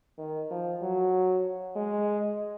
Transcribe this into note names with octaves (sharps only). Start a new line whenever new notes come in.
D#3
F3
F#3
G#3